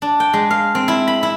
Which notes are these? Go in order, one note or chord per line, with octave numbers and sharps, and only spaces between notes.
D4
G5
G#3
F5
C4
E4
B5
E4